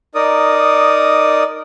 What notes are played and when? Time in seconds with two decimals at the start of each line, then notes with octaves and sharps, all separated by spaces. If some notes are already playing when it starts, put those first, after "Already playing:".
0.15 D#4 A#4 D5 D#6